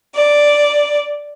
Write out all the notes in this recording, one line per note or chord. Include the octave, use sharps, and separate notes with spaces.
D5